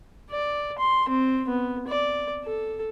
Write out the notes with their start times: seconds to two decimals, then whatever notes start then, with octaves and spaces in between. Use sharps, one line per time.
0.30 D5
0.78 C6
1.08 C4
1.48 B3
1.87 D5
2.44 A4